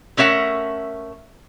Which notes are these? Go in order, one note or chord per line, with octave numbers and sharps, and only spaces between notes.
A3 C#4 A#4 E5 F#5